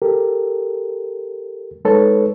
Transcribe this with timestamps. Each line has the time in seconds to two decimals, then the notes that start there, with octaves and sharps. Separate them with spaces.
0.02 G4 A4 A#4
1.85 G#3 D#4 A4 B4 C#5